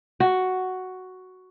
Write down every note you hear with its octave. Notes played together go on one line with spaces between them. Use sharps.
F#4